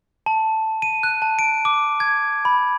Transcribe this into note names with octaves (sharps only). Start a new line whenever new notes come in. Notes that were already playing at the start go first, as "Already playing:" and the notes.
A5
D#7
F#6
A5
D7
D6
G#6
B5